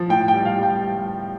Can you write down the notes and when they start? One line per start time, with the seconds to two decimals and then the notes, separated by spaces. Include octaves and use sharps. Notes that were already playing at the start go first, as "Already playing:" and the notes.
Already playing: F3
0.09 A2 G5
0.28 G5
0.33 G3
0.45 F5
0.58 G3 G5